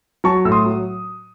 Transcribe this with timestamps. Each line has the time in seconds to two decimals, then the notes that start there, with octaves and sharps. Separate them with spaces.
0.24 F#3 A5 C#6
0.45 A2 E6
0.52 C6 D#6
0.66 F#3